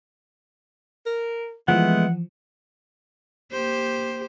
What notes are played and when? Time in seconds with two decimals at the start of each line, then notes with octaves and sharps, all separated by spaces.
1.06 A#4
1.68 E3 F3 G#3 A3 B3 F#5
3.52 A#3 G4 C5